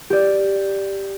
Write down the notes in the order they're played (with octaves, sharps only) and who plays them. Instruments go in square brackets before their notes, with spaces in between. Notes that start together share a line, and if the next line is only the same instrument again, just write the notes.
[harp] G4 D5